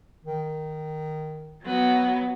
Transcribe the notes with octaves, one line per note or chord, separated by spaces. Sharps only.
D#3
F#3 B3